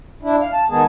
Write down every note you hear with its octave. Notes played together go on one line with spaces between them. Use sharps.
D4 E4
F5
A5
D#3 G#3 B3 G#4 A5